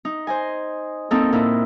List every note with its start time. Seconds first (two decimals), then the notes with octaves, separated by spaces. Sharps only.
0.05 D#4
0.27 C5 D#5 G#5
1.11 A#3 C4 D#4 A4
1.33 A#2 D#4 E4